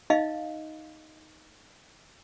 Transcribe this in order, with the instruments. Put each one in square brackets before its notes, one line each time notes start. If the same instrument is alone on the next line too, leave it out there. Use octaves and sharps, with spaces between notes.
[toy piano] D#4 D#5 F5